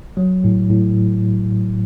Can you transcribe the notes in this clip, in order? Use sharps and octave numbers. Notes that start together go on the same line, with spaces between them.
F#3
A2
A2